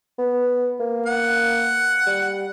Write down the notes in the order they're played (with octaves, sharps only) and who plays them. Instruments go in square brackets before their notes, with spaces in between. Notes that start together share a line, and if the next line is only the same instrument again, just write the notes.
[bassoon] B3
A#3
[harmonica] F#5
[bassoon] G3